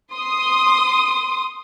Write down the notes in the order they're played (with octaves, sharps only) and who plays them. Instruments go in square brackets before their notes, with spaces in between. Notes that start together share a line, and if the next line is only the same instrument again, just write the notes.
[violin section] C6 D#6